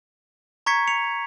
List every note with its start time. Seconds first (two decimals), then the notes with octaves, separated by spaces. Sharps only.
0.66 A#5 C#6 G#6 B6 C#7
0.88 C#7 F7